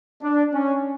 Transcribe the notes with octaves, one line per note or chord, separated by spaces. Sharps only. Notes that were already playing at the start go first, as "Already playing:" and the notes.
D4
C#4